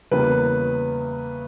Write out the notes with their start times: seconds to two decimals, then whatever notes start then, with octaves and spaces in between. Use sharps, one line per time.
0.11 E2 C#3 E3 G3 A#3 B4